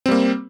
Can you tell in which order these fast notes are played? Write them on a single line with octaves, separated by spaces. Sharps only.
C4 G3 A#3